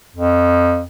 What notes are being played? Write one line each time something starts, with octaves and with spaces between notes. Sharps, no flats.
F2